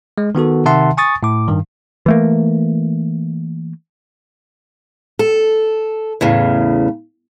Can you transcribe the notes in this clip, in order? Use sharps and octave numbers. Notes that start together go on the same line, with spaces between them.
G#3
D#3 B3 F#4 A4
C3 D#3 E5 F#5 A5 C6
G#5 C#6 D#6 A6
A2 D6
G2 D#3
E3 A3 A#3
A4
E2 A2 C#3